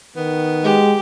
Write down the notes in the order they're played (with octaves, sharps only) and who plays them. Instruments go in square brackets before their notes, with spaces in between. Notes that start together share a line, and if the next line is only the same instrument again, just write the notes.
[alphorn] D#3 [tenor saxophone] B3
[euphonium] G#3 [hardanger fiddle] G4